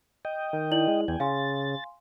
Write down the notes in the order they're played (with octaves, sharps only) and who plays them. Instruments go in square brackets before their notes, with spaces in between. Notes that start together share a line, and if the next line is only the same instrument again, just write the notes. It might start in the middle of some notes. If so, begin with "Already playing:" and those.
[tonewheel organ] D#5 G5
[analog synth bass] D#3
[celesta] E4 D5 F#7
[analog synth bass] G#3
[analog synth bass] E2 [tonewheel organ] G5 G#5
[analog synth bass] C#3 [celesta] F5 G#5 C6 [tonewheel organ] A6